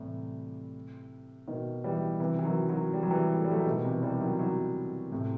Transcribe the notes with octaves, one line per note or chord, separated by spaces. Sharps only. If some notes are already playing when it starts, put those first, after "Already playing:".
Already playing: A2 C3 E3 G3
B2 D#3
E3 G3
C3 E3
E3
D#3 F#3
D#3 F#3
G3
F#3
E3 G3
A3
G3
F#3 A3
B2 D#3
C3 E3
E3 G3
D#3 F#3
D#3 F#3
A2 C3